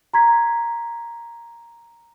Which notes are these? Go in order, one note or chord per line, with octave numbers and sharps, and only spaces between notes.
A#5 C6 G#6 B6